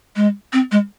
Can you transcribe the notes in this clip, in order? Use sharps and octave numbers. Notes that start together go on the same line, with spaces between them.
G#3
C4
G#3